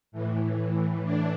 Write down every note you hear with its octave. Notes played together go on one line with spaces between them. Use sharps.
A2 E3
A2 E3
A2 E3 D4